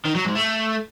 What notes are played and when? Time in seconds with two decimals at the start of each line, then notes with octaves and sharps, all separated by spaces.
0.05 D#3
0.15 F#3
0.25 G#2
0.35 A3